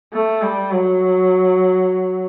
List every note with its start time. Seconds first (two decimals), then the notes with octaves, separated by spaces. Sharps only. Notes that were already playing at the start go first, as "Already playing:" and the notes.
0.13 A3
0.42 G3
0.71 F#3